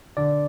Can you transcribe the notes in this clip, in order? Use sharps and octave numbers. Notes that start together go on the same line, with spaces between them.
D3 D5